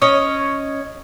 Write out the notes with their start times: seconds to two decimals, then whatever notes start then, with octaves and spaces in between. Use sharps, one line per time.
0.01 C#4 C#5 D#5